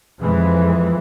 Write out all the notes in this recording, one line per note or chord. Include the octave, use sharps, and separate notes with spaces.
F2 E3 G#3